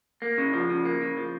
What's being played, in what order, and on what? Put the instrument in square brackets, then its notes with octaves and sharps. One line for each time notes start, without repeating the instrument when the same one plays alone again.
[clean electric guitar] A#3
C#3
F3
C#3
A#3
C#3
F3